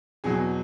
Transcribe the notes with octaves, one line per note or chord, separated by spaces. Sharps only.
E2 B2 F#3 G#4